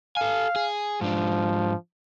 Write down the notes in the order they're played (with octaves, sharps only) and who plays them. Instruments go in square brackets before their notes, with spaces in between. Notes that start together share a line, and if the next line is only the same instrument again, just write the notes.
[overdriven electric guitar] A4 G#5 [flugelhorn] F5
[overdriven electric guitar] G#4
[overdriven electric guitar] G#2 D4 [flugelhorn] F3